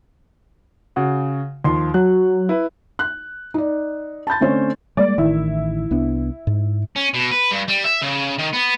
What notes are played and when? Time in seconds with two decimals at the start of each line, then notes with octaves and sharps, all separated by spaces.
0.96 C#3 F#4 F#5
1.64 D#2 F3 C6
1.94 F#3 F#6
2.49 E4 B4
2.99 F#6
3.54 D#4 D5
4.27 A5 B5 G6 A6
4.40 D3 A3 C4 C#4 C5 C#5
4.97 G3 G#3 A#3 D5
5.18 A1 D#3 E4
5.91 C2 B3 D4
6.47 G#2
6.96 C#4
7.14 B2
7.32 B4
7.51 G2
7.69 G3
7.85 E5
8.02 C#3
8.38 D#3
8.53 B3